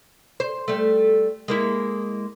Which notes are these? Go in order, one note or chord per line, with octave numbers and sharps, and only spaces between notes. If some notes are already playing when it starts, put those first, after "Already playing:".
C5
G3 A3
G#3 A#3 E4